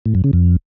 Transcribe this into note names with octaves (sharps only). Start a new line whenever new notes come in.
A2
F#2
C#3
F2